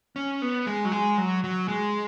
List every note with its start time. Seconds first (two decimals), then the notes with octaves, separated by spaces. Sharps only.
0.16 C#4
0.42 B3
0.67 G#3
0.85 F#3
0.92 G#3
1.17 F#3
1.44 F#3
1.68 G#3